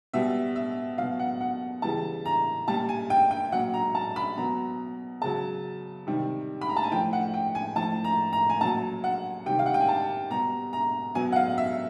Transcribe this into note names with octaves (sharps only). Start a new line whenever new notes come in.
B2 G3 E5
E5
B2 F#3 F5
F#5
F#5
C#3 E3 G3 A5
A#5
A#2 G3 A5
G#5
G5
G5
A#2 F#3 F#5
A#5
A5
B5
B2 F#3 A#5
C#3 F#3 A5
C3 D#3 G3
B5
A#5
A5
G#5
A2 F3 G5
F#5
G5
G#5
A2 F3 A5
A#5
A#5
G#5
A#2 F#3 A5
F#5
C3 D#3 G3 G5
F5
F#5
G5
G#5
A5
B2 G3 A#5
A#5
B2 F#3 G#5
F#5
F5
E5